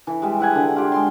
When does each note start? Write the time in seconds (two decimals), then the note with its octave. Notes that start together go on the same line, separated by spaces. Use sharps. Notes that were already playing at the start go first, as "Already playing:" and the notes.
0.07 E3
0.22 G3 G#3
0.40 E4 F#5 G#5
0.55 D3
0.76 F4 G4
0.92 G#3 C6